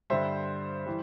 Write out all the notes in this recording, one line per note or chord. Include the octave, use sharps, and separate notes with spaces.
G2 D3 G3 C5 E5
E3 G3